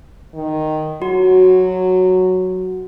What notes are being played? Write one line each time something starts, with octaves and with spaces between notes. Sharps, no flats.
D#3
F#3 F#4